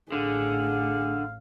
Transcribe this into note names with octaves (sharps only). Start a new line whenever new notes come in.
A1 A2 D3 G#4 F5